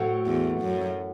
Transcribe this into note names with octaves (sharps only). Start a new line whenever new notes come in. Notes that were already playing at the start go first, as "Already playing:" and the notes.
Already playing: A2 F#3 A3 C4 F#4
E2
F#2